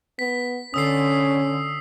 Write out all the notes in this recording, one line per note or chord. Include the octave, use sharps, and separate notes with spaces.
B3 B6
D3 C#4 D#6 E6 C7